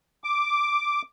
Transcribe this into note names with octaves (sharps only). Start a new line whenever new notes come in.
D6